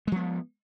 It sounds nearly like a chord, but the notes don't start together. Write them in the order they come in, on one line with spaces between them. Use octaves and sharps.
G#3 F3 B3